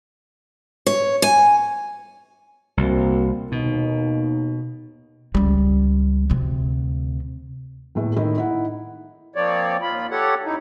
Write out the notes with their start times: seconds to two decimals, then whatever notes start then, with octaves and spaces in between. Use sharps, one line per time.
0.87 C#5
1.22 G#5
2.77 C2 A#3 C4 F#4
3.52 D#2 B2 D#4
5.35 C#2 G3
6.30 D2 C3
7.95 E2 A2 E3
8.16 A2 D#3 D#4 E4
8.36 D#4 E4 F#5
9.36 F3 A#3 C4 C#5 D5
9.82 D#2 F4 B5
10.11 G4 A4 C#5 F#5
10.45 F#2 D#4 E4